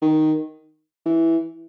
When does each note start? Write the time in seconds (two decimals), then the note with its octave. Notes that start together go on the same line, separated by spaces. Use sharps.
0.02 D#3
1.06 E3